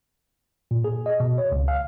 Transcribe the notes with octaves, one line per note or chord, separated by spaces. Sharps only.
A#2
G#4
D#5
B2
C#5
C#2
F5